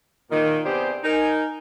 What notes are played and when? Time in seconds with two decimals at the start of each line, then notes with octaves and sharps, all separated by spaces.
0.30 A#2 D#3 A#3
0.64 C3 B3 D4 G4 G#4 C5
1.04 D#4 A#4 G#5